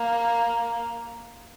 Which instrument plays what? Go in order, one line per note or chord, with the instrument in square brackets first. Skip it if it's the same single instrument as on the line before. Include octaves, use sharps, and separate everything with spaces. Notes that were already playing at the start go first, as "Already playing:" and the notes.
Already playing: [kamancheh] A#3